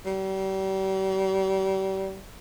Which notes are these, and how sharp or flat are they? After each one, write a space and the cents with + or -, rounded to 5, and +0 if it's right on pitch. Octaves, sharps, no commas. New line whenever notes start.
G3 -35